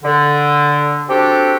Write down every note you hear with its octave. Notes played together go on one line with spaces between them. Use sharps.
D3
C4 D4 F#4 G4 A4